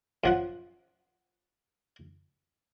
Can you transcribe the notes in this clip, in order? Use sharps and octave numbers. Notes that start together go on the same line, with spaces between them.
F#2 F3 F#5